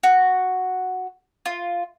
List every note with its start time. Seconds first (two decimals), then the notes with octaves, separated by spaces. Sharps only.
0.03 F#4
1.46 F4